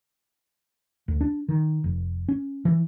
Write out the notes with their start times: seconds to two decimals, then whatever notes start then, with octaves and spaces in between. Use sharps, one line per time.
1.08 D2
1.21 D4
1.48 D#3
1.84 F1
2.28 C#4
2.65 E3